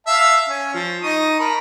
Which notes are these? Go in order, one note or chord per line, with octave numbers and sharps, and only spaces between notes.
E5 F5 A5
C#4
F3
D#4 C#6 D#6
A#4 A5 B5